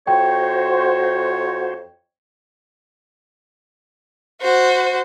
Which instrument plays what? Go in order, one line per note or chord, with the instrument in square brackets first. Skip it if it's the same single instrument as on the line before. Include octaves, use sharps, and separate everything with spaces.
[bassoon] F2 [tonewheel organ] F#4 C5 [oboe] C#5 [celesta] G5
[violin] F#4 C5